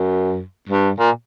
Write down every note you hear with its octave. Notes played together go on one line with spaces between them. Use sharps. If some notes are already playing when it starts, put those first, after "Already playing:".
Already playing: F#2
G2
A#2